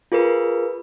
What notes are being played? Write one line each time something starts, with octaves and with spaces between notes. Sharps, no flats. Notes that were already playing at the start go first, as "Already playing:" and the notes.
F4 G#4 A#4 B4